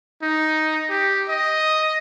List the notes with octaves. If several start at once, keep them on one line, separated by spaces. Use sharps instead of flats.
D#4
G4
D#5